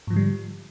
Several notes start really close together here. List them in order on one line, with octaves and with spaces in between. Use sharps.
G#2 F3 D3 G3